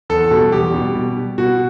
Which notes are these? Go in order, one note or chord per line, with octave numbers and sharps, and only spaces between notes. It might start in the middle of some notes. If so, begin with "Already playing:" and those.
E2 A4
B2 G3
E2 G4
B2 G3
B2
G3
B2 F#4